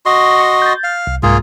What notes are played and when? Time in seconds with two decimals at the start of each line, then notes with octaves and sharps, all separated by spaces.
0.06 F#4 D#5 C6
0.40 C#6
0.62 G6 A6
0.84 F5
1.07 C2
1.23 C2 G#2 A#3 F4 G#4